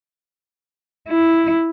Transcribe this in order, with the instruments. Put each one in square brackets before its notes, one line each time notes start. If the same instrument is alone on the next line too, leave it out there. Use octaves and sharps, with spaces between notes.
[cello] E4